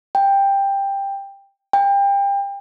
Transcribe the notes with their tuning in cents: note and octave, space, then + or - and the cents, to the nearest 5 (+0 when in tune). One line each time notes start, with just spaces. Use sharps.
G5 +10
G5 +30